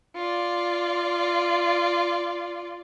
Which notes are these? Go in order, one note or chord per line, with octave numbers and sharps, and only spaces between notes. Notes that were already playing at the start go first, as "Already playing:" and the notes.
F4 D5